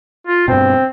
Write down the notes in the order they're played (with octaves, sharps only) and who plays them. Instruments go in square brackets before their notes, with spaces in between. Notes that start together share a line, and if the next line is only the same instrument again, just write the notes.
[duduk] F4
[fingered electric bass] G2 B2 [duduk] C4